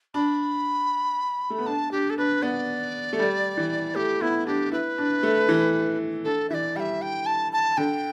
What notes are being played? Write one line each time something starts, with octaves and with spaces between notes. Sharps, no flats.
D4 B5
A3
B3
D4 A5
D4 G4
A4
D4 B4
B3 D5
A3
G3
E3
A3 G4
B3 E4
D4 G4
E4 B4
D4
A3
E3
D3 A4
E3 E5
D5
G3 E5 G5
G5
A5
A5
D3 G5